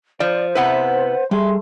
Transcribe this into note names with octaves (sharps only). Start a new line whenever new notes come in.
F3 C5 D5
C3 B3 E4 B4 F#5
G3 A3 G#4 C6